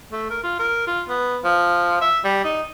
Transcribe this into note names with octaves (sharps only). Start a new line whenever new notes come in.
A3
A#4
F4
A#4
F4
B3
F3
E5
G3
D#4